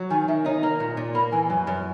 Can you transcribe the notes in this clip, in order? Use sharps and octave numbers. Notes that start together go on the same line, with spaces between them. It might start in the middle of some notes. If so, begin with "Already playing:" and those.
Already playing: F#3
D#3 G#5
D#3 E5
D#4 C#5
A#3 A#5
A#2
A#2
A#3 B5
E3 G#5
F#2 G#5
F#2